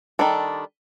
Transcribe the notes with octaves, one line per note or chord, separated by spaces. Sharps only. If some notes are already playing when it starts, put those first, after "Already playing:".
D#3 G3 D4 A4